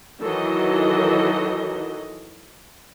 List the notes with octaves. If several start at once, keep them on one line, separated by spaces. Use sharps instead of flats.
D#3 E3 F#3 A4 D#5